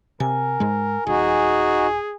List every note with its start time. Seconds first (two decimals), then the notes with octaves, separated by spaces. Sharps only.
0.20 C3 A#4 G#5
0.60 G#2 G#3
1.07 D#1 D#4 F#4 G#4